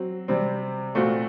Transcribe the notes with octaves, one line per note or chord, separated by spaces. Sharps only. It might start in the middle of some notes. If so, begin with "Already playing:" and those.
Already playing: F#3 C4
C3 G3 C4
A#2 A3 C4 F#4